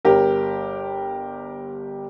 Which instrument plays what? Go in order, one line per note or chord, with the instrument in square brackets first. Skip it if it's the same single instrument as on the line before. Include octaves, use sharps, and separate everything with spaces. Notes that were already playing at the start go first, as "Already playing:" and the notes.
[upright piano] G1 G4 A#4